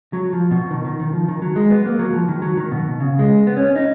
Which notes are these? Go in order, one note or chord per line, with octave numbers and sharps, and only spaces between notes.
F#3
F3
B2
D#3
D#3
D#3
F3
D#3
F#3
G#3
B3
A#3
F#3
F3
D#3
F#3
D#3
B2
C#3
G#3
B3
C#4
D#4